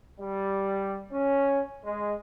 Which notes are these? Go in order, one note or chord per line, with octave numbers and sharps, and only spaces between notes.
G3
C#4
G#3